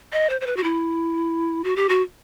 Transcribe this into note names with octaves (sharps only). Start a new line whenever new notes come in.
D#5
C5
C5
B4
F#4
E4
F#4
G4
F#4